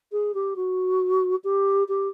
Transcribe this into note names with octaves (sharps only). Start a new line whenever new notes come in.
G#4
G4
F#4
G4
G4